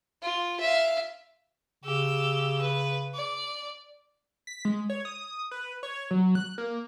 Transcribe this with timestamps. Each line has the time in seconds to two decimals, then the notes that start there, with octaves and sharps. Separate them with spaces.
0.22 F4
0.60 E5 F5
1.84 C#3 G4 E6
2.61 B4
3.15 D5
4.47 B6
4.65 G#3
4.90 C#5
5.05 D#6
5.51 B4
5.83 C#5
6.11 F#3
6.35 F#6
6.58 A#3